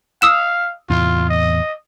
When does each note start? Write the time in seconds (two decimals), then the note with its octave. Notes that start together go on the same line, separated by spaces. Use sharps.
0.22 F5 D#6 E6 E7
0.90 E2 A2 C3 F4
1.29 D#5